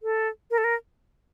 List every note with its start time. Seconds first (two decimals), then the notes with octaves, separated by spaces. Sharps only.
0.03 A4
0.51 A#4
0.58 A4
0.64 A#4